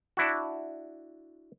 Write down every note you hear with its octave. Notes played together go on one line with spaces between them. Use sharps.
D4 E4 F#4